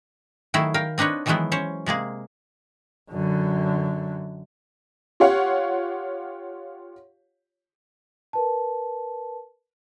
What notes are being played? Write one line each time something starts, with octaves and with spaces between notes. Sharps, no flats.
D#3 F#3 A3 E4 G#4
A#4 F5 G5
C4 D4 D#4 B4 C#5
D#3 E3 F#3 G#3 B3 E4
C#4 C5 C#5
C3 G#3 A#3 G#4
F#2 D3
F4 G4 C#5 F5 F#5
A#4 B4 A5